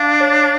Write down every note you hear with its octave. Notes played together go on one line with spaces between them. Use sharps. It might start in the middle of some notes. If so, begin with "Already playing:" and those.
Already playing: D4 F5
C#5